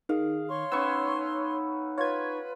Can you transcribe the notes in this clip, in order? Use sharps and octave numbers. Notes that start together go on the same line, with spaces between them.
D#3 G#4 F5
C#5 C6 C#6
B3 C#4 D#4 C#6 E6
F4 B4 C#5 G#6